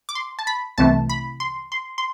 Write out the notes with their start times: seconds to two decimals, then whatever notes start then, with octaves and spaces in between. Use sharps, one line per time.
0.09 D6
0.15 C6
0.39 A5
0.47 B5
0.78 C2 C3 E3 A3 A5
1.10 B5
1.40 C6
1.72 C6
1.98 C6